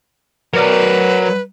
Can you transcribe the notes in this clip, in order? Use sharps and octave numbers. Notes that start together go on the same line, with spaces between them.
F#3 A#4 B4 D5